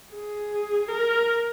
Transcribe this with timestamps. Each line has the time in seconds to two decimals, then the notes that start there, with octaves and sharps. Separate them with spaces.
0.15 G#4
0.89 A#4